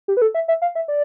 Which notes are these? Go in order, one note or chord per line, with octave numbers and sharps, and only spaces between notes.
G4
B4
A4
E5
E5
F5
E5
D5